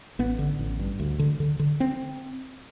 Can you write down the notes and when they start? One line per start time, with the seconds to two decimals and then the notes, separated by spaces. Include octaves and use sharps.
0.19 A1 B3
0.39 D3
0.59 A1
0.79 G2
1.00 D2
1.19 D3
1.40 D3
1.59 D3
1.80 C4